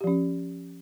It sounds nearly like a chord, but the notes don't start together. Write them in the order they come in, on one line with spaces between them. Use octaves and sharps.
G4 F3 C#4